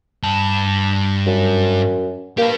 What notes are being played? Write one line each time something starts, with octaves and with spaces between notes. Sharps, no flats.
G2 A5
F#2
A#3 G4 B4